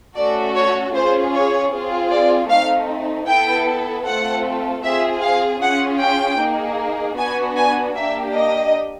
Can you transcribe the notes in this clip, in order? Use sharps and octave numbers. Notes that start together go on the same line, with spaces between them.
A3 C#4 F#4 A4 D5
C#5
C#4 F4 G#4 C5
C#5
C4 F4 G#4
D5
A3 C4 D#4 F5
B3 E4 A4 G5
A3 C4 F4 A4 F#5
C4 F4 G#4 E5
F5
C#4 F4 G#4 F#5
G5
A#3 D#4 G#4
B3 D4 F#4 G#5
G#5
A#3 D4 G4 E5
D#5